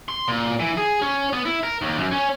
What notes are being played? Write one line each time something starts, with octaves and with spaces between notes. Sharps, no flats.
C6
A#2
E3
G#4
C#4
B3
E4
A#4
D#2
F#2
C#4